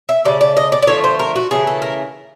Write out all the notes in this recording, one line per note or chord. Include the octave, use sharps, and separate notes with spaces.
E5
C#3 F#3 A3 D5
D5
D#5
D5
D5
D3 F3 A3 C#5
C5
A#4
F#4
C#3 E3 A3 G#4
A4
A#4